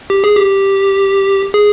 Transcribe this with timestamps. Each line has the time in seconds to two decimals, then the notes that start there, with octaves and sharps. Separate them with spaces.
0.10 G4
0.24 G#4
0.37 G4
1.54 G#4